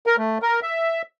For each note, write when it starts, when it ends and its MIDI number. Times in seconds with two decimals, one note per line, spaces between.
0.07 0.16 70
0.18 0.38 57
0.42 0.60 70
0.62 1.02 76